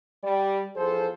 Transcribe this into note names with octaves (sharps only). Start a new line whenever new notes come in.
G3 D5
E2 F3 G#4 A4 C5